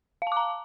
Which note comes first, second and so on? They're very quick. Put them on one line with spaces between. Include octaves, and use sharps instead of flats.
F5 A5 D6 A#5